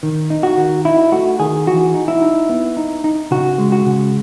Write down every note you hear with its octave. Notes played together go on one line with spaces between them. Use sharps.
D#3
D#4
F#4
D#3
D#4 E4
A3 F#4
D#3 G#4
E3 F#4
D#4
E4
D#4
B3
D#4
D#4
C#3 F#4
G#3
F#4
C#3